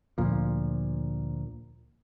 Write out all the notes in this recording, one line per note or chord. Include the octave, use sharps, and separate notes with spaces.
D2 A#2 F3